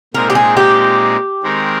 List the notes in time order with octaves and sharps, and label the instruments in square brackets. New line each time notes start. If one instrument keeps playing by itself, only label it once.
[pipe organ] A#2 G#3 C4 D#4 [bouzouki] A#4
[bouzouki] G4
G#4
G4
[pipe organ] D#3 G#3 C4 D#4 A#4